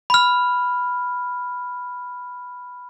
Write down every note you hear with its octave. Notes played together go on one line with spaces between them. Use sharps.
B5 F6